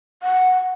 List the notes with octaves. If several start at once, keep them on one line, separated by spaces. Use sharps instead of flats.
F#5